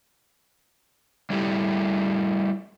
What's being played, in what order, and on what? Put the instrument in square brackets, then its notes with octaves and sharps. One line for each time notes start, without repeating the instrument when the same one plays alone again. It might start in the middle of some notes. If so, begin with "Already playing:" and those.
[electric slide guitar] G3 A3 E4 G4